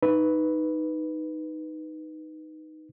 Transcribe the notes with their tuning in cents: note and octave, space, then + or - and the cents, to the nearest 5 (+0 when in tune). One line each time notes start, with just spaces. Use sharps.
D#4 +0 B4 +0